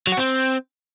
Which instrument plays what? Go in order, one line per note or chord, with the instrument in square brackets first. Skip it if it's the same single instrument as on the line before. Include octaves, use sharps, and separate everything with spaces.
[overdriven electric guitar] F#3
F#4
C4